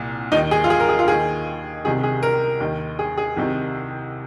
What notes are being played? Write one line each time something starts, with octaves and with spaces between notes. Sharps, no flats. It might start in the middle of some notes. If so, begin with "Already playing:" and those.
Already playing: C2 A#2
D#2 D#3 D#4
G#4
F4
G#4
A#4
G#4
F4
D#2 D#3 G#4
C2 C3 D#3 G#4
G#4
A#4
D#2 D#3
G#4
G#4
C2 C3 D#3